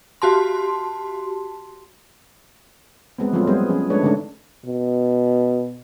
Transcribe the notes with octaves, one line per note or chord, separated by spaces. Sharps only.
F#4 G4 A5 C6
G#3 B3 C4
F3 F#3 G#3 A3 C4 F4
G3 B3 C4 G#4 C5
F3 C#4 G#4
G#3 A3 D4 B4 C#5
D3 D#3 G#3 A3 C#4 D4
B2